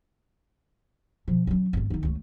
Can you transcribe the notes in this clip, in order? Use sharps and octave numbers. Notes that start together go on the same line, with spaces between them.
B2 F3
F#3 C#4
G#1 A3
D#3 D#4
C#2 A3